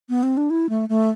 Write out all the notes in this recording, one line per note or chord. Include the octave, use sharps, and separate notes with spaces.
B3
C4
D4
E4
A3
A3